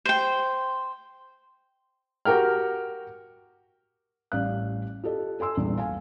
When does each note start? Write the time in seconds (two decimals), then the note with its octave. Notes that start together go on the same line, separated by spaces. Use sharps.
0.05 C5 G5
2.25 F#4 G4 A#4 G5 F6
4.32 A1 G3 D5 F5 F#6
5.04 F4 G4 A4 D#5
5.40 A4 G#5 C6 E6
5.57 A#1 E2 G2
5.77 F5 G#5